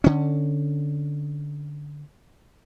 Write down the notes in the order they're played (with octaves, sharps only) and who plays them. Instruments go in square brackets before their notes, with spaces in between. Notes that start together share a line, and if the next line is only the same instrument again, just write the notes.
[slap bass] D3 C#4